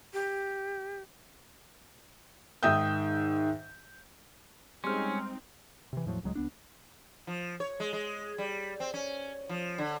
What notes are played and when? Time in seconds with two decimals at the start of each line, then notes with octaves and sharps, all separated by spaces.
0.14 G4
2.63 G#2 D#3 E5 G5 D#6 G6
4.84 G3 G#3 C4 C#4 D#4 C6 F6
5.93 C3 E3
6.06 E2 A2 F3 F#3
6.23 D1 C#2 F#3 G#3
6.35 C#2 B3 D4
7.27 F3
7.60 C#5
7.80 G#3
7.93 G#3
8.38 G3
8.80 C4
8.94 C#4
9.49 F3
9.78 D3